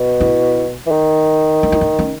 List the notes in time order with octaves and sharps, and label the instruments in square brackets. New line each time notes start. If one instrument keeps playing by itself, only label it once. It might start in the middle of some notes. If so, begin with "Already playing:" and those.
Already playing: [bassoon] B2
[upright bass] E4
[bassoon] E3
D#3
[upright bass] D#4
E4
D#4
C#4